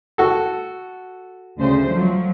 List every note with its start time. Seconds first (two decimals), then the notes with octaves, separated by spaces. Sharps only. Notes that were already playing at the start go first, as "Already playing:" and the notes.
0.18 F#4 A4
1.59 D2 C#3 C5
1.92 F3 F#3